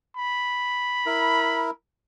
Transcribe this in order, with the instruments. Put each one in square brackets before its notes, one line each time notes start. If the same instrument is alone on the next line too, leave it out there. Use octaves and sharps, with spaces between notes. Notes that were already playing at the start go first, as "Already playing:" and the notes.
[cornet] B5
[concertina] E4 A#4